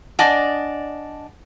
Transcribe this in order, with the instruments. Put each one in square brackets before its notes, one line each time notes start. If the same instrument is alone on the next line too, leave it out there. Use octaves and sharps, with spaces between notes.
[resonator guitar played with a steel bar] D4 D5 D#5 [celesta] F#5 G#5 A5